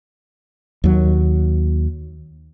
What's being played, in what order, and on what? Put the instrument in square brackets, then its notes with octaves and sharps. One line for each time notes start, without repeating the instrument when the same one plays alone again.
[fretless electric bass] D#2 F#3